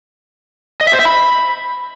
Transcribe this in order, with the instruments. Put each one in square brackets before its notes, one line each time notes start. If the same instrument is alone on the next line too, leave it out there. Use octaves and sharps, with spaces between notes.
[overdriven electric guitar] D#5
E5
C5
E5
B5